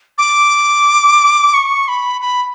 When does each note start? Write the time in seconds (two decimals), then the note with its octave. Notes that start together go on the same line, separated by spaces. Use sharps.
0.18 D6
1.54 C#6
1.88 B5
2.21 B5